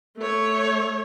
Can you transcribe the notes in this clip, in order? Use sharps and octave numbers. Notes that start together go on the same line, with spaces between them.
A3 C#5